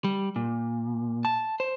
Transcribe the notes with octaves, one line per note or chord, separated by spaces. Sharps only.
G3
A#2
A5
C5